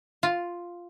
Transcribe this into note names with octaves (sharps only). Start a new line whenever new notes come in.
F4